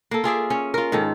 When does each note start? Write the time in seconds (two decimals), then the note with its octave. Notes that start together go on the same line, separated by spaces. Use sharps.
0.11 A#3 A4
0.24 F4 G#4 D5 E5
0.50 C#4
0.74 F4 A#4
0.92 G#2 D#3 A4